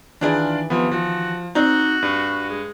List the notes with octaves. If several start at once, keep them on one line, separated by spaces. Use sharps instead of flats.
D#3 E3 D4 F4 G#4 D5
C3 F3 B3
F3 F#4
C4 D#4 F#4 D5
G2
G#3